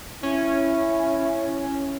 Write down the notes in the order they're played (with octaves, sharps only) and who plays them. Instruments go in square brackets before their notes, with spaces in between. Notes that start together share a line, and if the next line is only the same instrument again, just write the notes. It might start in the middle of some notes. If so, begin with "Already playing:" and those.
[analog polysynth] C#4 [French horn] E4